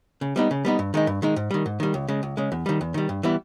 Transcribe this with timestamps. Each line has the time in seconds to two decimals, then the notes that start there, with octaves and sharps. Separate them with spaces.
0.21 C#3
0.36 G3 B3 D#4
0.51 C#3
0.65 G3 B3 D#4
0.79 G2
0.94 D#3 G#3 D#4
1.07 G2
1.22 D#3 G#3 D#4
1.36 G#2
1.51 D#3 G3
1.66 G#2
1.80 D#3 G3
1.94 C#2
2.08 C#3 G#3
2.23 C#2
2.37 C#3 G#3
2.52 E2
2.66 D#3 G3
2.81 E2
2.94 D#3 G3
3.09 G2
3.23 E3 G3 B3 E4